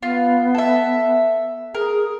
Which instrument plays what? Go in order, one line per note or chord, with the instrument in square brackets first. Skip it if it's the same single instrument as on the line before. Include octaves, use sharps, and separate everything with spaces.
[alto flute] B3 [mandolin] F4
[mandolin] A4 E5
[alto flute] G#4 [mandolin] A#4